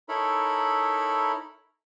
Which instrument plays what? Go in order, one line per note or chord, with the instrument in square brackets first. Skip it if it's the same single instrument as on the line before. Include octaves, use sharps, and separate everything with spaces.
[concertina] D#4 E4 A4 A#4 C#5 B5